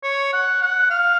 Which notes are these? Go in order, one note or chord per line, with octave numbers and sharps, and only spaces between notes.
C#5
F#5
F#5
F5